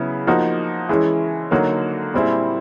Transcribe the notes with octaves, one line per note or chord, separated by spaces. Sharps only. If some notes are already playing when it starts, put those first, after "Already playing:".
Already playing: C#3 F#3 B3 E4
F3 A#3 D#4 F#4
E3 G#3 C#4 E4 G#4
D3 F#3 A#3 D#4 F#4
A#2 G3 C4 E4 G#4